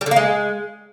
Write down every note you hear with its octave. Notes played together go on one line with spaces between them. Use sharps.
G3
D3
A#3
G#3